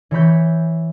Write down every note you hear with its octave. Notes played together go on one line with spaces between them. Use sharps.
E3 C#5 B5 G6